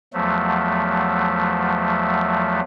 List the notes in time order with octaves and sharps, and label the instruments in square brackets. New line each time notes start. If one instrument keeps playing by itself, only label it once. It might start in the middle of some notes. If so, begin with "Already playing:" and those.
[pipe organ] E2 F3 F#3 A3